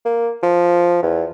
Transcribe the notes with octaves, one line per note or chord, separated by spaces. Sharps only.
A#3
F3
E2